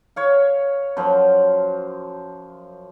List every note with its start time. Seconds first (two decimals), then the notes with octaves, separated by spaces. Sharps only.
0.16 C#5 F5
0.97 F#2 F3 C5